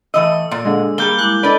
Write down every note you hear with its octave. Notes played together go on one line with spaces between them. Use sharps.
A2 E3 D#5 E6
A#2
D3 G#3
G3 A#3 G#4 A#5 G6 G7
G#3 E4 D6 F#6 G6
D4 A4 B4 D5 D#5